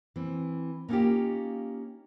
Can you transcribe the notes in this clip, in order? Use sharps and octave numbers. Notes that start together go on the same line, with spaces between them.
E3 C4
A#3 B3 C#4 D#4 F4 G4